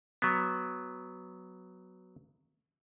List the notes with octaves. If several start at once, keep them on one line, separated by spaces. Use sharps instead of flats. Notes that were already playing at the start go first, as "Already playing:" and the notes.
F#3 B3